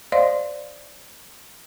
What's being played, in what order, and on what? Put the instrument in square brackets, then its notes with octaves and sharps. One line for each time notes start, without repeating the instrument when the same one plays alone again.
[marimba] C5 D5 D#5 F5 C6